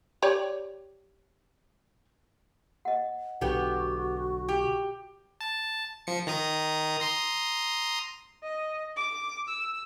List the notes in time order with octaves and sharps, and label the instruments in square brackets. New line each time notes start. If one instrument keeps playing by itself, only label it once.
[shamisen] G4 C#5 D5
[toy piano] D#5 F#5
[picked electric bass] B1 D3 [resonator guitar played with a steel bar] B3 G4 [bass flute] F#4
[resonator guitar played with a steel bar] G4
[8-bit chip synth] A5
F3 C#7
D#3 A#5 D#6
A#5 C6 D#6
[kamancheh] D#5
D6
E6